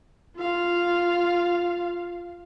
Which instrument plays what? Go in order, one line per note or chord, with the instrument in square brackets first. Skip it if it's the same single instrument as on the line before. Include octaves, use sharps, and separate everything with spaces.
[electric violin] F4 F5